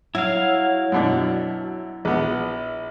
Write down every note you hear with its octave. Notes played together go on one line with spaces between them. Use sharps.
F#3 E4 F5
F#2 B2 D4
A#1 B3